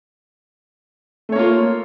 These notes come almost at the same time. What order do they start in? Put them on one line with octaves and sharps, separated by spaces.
A3 C#5 A#3 F4